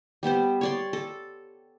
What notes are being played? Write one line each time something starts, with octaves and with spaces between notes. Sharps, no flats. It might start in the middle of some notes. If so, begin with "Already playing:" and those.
G3 B3 G4 C5
C#5 D5 C6
A4